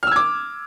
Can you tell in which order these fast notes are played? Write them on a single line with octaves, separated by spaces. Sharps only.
F6 E6 G#6 D6